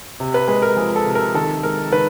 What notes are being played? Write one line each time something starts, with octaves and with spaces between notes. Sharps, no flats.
C3
B4
G#3 B4
A#4
F3 G#4
A4
C3
A#4
D#3 A4
G#3 A#4
D#3 B4